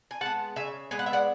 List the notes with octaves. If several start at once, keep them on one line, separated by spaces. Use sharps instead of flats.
G#5
G#3 B3 F#5 A5
C#3 E5 G#5
G#3 B3 G#5
F#5
E5
D5 F#5